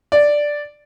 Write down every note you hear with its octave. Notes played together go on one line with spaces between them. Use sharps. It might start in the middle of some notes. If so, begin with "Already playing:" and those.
D5